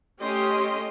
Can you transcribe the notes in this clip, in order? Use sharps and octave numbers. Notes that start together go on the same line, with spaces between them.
A3 C#4 G4 D#5 C6